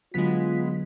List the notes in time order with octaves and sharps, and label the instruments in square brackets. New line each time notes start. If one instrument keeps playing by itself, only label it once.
[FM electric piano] D3 F#3 B6 [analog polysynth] G#3 B3 [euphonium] F4